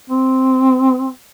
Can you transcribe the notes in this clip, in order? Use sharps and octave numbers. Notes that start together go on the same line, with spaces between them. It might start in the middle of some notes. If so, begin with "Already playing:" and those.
C4